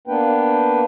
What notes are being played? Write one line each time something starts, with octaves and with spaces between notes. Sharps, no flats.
A#3 B3 D4 B4 G5